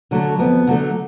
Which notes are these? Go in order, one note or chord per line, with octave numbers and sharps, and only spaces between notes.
D3 F#3 A3
F2 B3
D3 F#3 A3